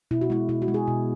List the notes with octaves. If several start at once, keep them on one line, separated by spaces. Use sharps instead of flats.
B2 E4
F#4
G#3 E4
B2 E4
F#4
G#3
G#4
B2